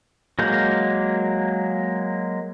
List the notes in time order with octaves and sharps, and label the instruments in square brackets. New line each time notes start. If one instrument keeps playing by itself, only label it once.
[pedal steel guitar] F#3 G#3 A#3 G6